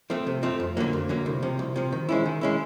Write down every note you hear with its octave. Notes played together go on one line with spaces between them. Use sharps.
F3 A3 C4
C3
F3 A3 C4
F2
D3 F#3 A#3
F2
D3 F#3 A#3
C2
C3 F3
C2
C3 F3
D#3
G#3 C#4 E4
D#3
G#3 C#4 E4